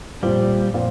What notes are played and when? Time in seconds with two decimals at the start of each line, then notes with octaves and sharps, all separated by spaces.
0.22 A#2 F3 G3 C4 F4
0.74 A#2 F3 C4 F4